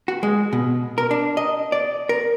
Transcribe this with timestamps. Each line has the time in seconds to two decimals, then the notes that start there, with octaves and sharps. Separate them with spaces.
0.08 F#4
0.23 G#3
0.53 B2
0.98 A#4
1.11 D4
1.37 D#5
1.72 D5
2.09 A#4